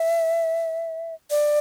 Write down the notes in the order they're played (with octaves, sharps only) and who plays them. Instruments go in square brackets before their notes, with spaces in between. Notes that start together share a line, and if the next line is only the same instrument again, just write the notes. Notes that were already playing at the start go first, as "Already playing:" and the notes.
Already playing: [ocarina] E5
D5